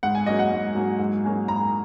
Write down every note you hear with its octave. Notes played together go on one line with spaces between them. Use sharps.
G#2 F#5
G#5
F#3 A#3 C#4 G#4 D#5
F#5
G#2
F#3 A#3 C#4 G#4
G#2
F#3 A#3 C#4 G#4
G#2 A#5